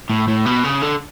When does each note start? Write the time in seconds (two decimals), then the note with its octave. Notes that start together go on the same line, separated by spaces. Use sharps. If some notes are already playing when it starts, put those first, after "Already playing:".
0.10 A2
0.28 A2
0.46 B2
0.64 C#3
0.82 D3